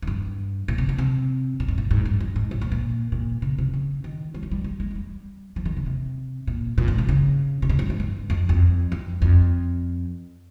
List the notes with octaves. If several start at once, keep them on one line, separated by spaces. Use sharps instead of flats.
G#2
G2
A#2
C3
C#3
C3
A#2
G#2
A#2
G#2
G2
G2
G#2
A#2
A#2
A#2
A#2
C#3
C3
C#3
D#3
G3
F3
G3
G3
G#3
G#3
G3
F3
D#3
C#3
C3
A#2
A#2
G#2
C3
C#3
C3
C#3
G2
G#2
G2
F2
F2
F2
F2